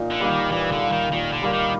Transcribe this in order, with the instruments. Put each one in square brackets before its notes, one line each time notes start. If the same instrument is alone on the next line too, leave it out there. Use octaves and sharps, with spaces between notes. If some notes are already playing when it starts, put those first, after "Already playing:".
Already playing: [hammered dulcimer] A#2 D#4
[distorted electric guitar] D3
[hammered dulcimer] G3 A#3 D#4
[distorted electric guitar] D#3
[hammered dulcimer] A#2 [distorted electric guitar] E3
[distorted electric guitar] D3
[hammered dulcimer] G3 A#3
[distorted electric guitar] D#3
[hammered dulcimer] A#2 [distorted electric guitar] D#3
[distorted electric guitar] D3
[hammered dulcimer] G3 A#3
[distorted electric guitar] D#3